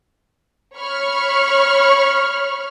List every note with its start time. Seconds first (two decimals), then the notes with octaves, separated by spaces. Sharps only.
0.77 C#5 B5 C#6 F6